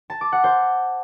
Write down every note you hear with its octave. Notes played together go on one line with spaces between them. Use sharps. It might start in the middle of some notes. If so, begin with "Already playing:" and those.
A5
D6
F#5
C5